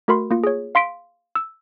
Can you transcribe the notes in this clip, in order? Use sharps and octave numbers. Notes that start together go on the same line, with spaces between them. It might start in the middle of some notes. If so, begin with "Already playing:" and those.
A3 F#4 A#4 B5 C6
A#3 F4
G#4 C#5
F5 C6 B6 D7
E6